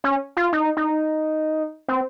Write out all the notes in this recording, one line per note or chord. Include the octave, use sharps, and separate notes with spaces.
C#4
F4
D#4
D#4
C4